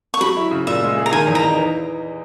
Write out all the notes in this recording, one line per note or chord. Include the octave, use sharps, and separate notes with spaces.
C#6
F#3 B5
E4
C#3
A#2 E5
G#3
G#4
A#5
D#3 G#5
E2
A#5
D#4
E3